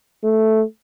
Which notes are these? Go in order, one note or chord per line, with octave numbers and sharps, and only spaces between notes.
A3